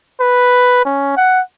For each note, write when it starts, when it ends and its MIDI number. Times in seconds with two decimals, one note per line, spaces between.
0.20 0.81 71
0.85 1.14 61
1.17 1.41 78